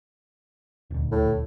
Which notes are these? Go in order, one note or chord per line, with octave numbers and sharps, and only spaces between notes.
D#1 D2
A2